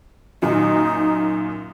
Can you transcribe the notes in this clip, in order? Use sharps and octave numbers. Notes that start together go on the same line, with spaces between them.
F#2 A#2 D#3 D#4